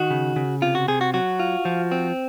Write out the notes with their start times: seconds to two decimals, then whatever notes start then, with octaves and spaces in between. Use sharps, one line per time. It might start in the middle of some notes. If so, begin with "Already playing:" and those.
Already playing: D#3 F#4
0.10 C#3
0.36 C#3
0.62 C3 F4
0.75 F#4
0.88 C3 G#4
1.01 F#4
1.14 F#3 F#4
1.40 F4
1.65 F3
1.92 C4